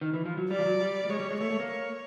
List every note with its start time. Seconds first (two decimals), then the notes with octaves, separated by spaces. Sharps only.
0.01 D#3
0.14 E3
0.25 F3
0.37 F#3
0.50 G3 D5
0.59 F3
0.65 F#3
0.81 G3
1.04 G3
1.09 G#3 C#5
1.20 G3
1.31 G#3
1.40 A3 C#5
1.50 A3
1.60 A#3
1.70 C#5